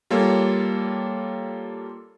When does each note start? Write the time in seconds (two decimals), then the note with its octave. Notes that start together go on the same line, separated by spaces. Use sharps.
0.10 G3 A#3 F4 A4 C#5